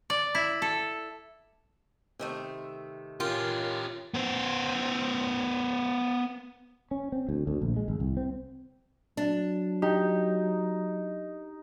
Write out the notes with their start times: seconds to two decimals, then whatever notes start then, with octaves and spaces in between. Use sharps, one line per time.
0.10 D5
0.35 E4
0.62 A4
2.19 C3 D#3 A3
3.20 C#4 F4 G4 A#4
4.14 B3 C5
6.91 C#4
7.12 C4
7.29 D2
7.47 D2
7.62 A#1
7.76 G#3
7.88 G#1
8.00 C2
8.17 C4
9.17 F#3 D4
9.82 D#4 G4